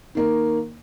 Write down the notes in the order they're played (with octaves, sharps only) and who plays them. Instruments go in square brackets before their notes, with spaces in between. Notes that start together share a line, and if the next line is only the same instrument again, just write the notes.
[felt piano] D#3 A#3 A#4